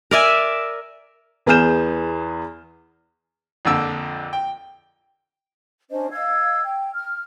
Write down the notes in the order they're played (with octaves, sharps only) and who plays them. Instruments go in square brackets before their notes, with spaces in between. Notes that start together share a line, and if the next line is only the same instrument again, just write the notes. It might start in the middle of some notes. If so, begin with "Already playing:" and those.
[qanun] A#4 D5 E5 G#5
[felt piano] E2 B3 G#4 F6 G6 E7
[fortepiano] A#1 F2 D3 E6
G5
[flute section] C#4 D4 C5 D#5
D#5 F5 E6 G#6
G5
F6